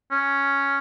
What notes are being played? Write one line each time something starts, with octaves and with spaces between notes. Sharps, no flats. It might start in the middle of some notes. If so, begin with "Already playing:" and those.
C#4